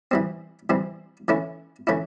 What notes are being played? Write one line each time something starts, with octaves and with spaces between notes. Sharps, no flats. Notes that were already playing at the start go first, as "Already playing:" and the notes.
E3 G3 C4
E3 G3 C4
E3 A3 C#4 E4
E3 A3 C#4 E4